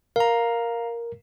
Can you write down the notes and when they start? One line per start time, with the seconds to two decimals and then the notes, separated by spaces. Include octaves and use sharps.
0.16 A#4 F5 A#5